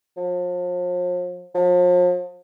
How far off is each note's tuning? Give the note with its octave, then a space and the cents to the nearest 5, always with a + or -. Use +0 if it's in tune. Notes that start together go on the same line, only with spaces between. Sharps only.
F3 +40
F3 +40